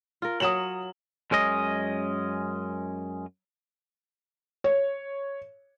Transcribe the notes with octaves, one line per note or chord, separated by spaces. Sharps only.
F4 A#4
F#3 F4 C#5 D#6 E7 F#7
F#2 G#3 C#4 D#5
C#5